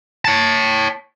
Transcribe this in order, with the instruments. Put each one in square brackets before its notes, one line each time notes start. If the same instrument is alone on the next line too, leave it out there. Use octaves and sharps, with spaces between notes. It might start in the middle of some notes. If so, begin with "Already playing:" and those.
[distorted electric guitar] C#5 A5